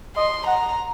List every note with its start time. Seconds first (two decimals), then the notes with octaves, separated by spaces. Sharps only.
0.16 D#5 C6
0.46 F#5 A#5